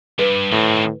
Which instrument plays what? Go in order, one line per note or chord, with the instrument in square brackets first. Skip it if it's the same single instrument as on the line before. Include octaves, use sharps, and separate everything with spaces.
[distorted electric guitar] G2 [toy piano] B4
[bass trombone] A2 [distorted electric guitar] D#3 C4